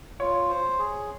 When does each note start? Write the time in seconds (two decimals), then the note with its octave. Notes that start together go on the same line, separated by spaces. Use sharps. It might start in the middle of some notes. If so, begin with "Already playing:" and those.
0.20 F4 C#5
0.50 C5
0.79 G#4